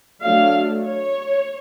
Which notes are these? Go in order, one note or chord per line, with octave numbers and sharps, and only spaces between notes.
F#3 A3 D4 F5
C#5